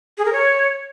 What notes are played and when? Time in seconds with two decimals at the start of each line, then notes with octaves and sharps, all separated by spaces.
0.18 G#4
0.25 A#4
0.33 C#5